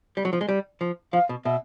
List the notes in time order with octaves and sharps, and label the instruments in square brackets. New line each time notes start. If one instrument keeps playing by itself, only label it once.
[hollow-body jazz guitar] G3
F#3
F3
G#3
G3
F3
[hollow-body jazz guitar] F3 [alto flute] F5
[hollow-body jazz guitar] B2
[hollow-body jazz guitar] B2 [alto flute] E5